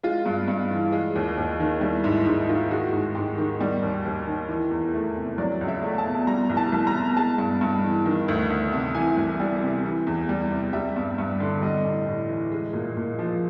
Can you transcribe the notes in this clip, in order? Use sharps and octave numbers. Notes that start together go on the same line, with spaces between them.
G#3 F4
G2
G2
E3
G#3
D#2
D#2
D#3
G3 E4
G#2 E4
G#2 D#4
D#3 F4
G#3 F#4
G#2
G#2 G4
D#3
G3
D#2
D#2
D#3
E3
E2
A3
C3
F#3 D5
C#2
E5
A3
A5
B2
G3 A#5
C2
A5
C2
A#5
B2
G#3 A5
G2
G2
E3
D#3
D2
D2
C3
E3 G#5
C2
G3
C3
E3
E2
G3
C3
G3 E5
G2
G2
D3
G3 D#5
A2
A2
E3
G#3
A#2
A#2
F3